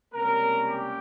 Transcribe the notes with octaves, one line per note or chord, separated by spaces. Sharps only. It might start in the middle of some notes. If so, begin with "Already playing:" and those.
C#2 C3 G3 A#3 C#4 A#4
G4